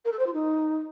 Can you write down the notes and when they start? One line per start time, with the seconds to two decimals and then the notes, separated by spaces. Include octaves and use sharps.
0.05 A#4
0.12 A4
0.19 C5
0.26 F4
0.33 D#4